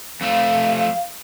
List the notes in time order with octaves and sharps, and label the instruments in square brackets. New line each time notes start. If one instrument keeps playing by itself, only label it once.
[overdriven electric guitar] F2 A3 [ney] F5